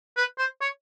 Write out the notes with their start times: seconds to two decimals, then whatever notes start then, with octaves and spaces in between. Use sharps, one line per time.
0.17 B4
0.38 C5
0.61 C#5